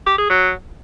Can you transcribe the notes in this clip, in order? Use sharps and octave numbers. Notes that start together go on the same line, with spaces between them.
G4
G#4
F#3